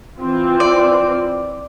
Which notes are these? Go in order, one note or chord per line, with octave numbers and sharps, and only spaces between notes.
E3 C4 F4
D5